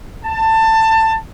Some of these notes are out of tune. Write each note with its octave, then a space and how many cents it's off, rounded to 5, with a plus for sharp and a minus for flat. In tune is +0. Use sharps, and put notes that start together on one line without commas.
A5 +20